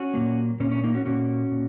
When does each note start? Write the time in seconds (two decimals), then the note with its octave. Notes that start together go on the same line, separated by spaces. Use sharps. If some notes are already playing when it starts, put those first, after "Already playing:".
Already playing: C#4 F#4
0.14 A#2 F#3 A#3
0.60 A#2 A#3 C#4
0.71 C#4
0.84 A#3 D#4
0.94 C#4 F#4
1.05 A#2 A#3 C#4 F#4
1.51 A#2